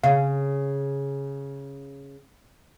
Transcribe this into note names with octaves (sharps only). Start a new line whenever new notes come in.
C#3 F5